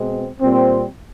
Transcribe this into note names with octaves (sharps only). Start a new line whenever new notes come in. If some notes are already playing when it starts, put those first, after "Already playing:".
Already playing: B2 G#3 C4
A#2 G3 C4